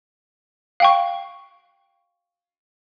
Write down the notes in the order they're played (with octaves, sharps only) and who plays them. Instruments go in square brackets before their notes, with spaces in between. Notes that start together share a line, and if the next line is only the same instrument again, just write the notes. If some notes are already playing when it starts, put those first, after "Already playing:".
[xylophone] F5 G5 C#6